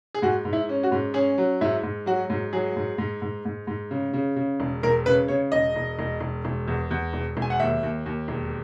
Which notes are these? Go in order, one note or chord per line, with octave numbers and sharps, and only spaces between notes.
G#4
G#2 F#4
G#2
E4
C#4
F#4
G#2
C#4 G#4
F#3
G#2 E4
G#2
F#3 F#4
G#2
F#3 G#4
G#2
G#2
G#2
G#2
G#2
C#3
C#3
C#3
E1
E1 A#4
C#3 B4
C#3 C#5
E1 D#5
E1
E1
E1
E1
E2
E2
E1
E1
G#5
F#5
D#2 E5
D#2
D#2
E1